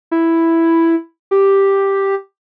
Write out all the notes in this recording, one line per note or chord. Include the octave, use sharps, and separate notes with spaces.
E4
G4